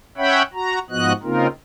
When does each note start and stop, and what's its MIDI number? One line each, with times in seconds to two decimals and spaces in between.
0.17 0.42 61
0.17 0.42 73
0.17 0.42 76
0.17 0.42 78
0.17 0.42 79
0.17 0.42 83
0.54 0.79 66
0.54 0.79 82
0.90 1.13 44
0.90 1.13 53
0.90 1.13 59
0.90 1.13 66
0.90 1.13 75
0.90 1.13 90
1.23 1.47 49
1.23 1.47 58
1.23 1.47 60
1.23 1.47 63
1.23 1.47 65
1.23 1.47 70